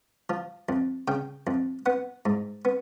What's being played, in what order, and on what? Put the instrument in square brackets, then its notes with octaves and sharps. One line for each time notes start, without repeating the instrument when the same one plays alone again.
[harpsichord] F3
F2
C#3 G5
F2
B3 F#5
G#2
B3